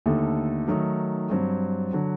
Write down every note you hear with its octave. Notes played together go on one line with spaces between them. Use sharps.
D#2 D3 A3 D#4 A4
D#3 F#3 A3 D#4
G2 F#3 C4
D3 F#3